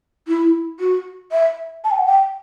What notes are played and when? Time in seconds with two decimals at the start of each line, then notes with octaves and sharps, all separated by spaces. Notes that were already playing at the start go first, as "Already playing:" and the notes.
0.28 E4
0.80 F#4
1.32 E5
1.84 A5
1.91 G5
1.98 F#5
2.07 G5